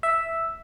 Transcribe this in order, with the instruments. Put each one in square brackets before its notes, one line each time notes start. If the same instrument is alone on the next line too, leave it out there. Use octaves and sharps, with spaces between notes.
[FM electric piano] E5